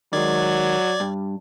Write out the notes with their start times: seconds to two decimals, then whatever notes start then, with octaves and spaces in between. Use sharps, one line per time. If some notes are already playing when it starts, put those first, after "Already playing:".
0.13 D#3 F#3 G#3 D5 G#6
1.00 G2